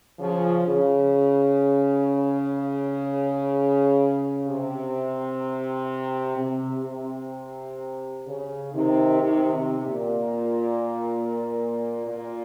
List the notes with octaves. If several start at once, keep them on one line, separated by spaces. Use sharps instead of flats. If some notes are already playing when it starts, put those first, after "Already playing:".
C#3 F3
C#3
C3
C3
C3
C#3
C3 D#3
C3 D#3
C3
A#2
A#2